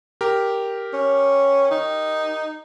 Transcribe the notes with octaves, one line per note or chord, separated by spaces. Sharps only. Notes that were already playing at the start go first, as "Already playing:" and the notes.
G4 A#4
C#4
D#4